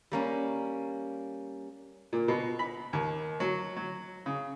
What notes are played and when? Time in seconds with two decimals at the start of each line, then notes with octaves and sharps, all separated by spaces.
0.12 G3 A#3 C#4
2.13 A#2
2.28 B2
2.59 B5
2.93 D#2
3.40 F#3
3.76 F#3
4.26 C#3